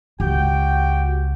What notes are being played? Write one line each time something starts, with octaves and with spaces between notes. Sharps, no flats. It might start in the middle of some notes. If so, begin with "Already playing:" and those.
C#2 F#4 G4 G5